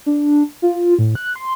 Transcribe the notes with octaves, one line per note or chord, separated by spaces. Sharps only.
D4
F4
A2
F#6
C6